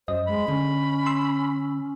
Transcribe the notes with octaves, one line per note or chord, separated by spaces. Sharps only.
F#2 C5 D#5
G#3 B5
D3 C#4
C6 E6